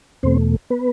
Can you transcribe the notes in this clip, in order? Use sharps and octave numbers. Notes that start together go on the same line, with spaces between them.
E2 B2 A3 C4 C5
B3 B4